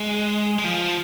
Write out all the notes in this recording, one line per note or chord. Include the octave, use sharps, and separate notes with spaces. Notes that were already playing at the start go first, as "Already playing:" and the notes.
Already playing: G#3
G#3
F3